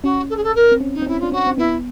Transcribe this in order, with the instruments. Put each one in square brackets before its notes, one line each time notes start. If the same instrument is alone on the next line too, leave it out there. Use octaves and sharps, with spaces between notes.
[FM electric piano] C#4 [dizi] F#4
[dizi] A4
G#4
A4
A#4
[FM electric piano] C4
C#4
[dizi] D#4
[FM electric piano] C4
[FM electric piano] C#4 [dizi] E4
[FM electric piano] D4 [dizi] F4
[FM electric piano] C#4 [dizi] F#4
[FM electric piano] C4
[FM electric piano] B3 [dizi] E4